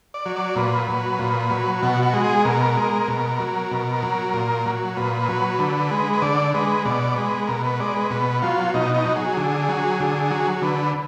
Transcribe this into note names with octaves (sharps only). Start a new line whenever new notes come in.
D5
F#3
D5
A#2 B4
F#3
A#2
F#3
B2 F#4
F#4
G#3
G#4
B2 A#4
G#3
B2
F#3
B2
F#3
A#2
F#3
A#2 B4
F#3
D3
G#3
B4
D3 D5
G#3 B4
B2 D5
G#3 B4
B2 A#4
B4
G#3 D5
B4
B2 B4
F#3 F4
B2 D#4
D#4
F#3
G#4
D3
F#3
D3
F#3
D3 B4